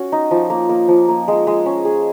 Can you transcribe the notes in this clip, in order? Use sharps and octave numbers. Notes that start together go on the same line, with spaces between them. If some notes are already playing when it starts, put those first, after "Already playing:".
Already playing: C#4 F#4
D#4
F3
A#3
A#3
F3
A#3
G#3
G#3
C#4
G#4